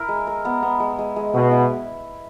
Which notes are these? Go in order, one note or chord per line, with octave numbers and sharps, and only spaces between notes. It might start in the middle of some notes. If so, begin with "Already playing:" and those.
Already playing: E4 A#4
G#3
A#4
B3
B3
G#3
G#3
G#3
B2 G#3
E4